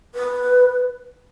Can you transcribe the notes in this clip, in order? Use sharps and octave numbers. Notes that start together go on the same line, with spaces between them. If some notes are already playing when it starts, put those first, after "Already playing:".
B4